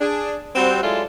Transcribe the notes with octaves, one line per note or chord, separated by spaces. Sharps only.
D4 G#4
G3 C4 F#4
F#3 G#3 E4 F4 A4 D5